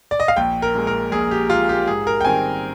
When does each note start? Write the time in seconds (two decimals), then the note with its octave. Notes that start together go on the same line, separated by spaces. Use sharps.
0.11 D5
0.20 D#5
0.28 F5
0.36 A#1 G5
0.62 A#4
0.75 A#2 G#3
0.87 A#4
1.12 A#1 G#4
1.31 G4
1.50 A#2 G#3 F4
1.69 G4
1.87 G#2 G#4
2.07 A#4
2.21 G5
2.25 D#3 G3 C4 G#5